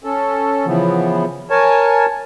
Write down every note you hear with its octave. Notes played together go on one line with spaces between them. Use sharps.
C#4 A4
C#3 E3 F3 B3
A#4 C#5 G#5 A5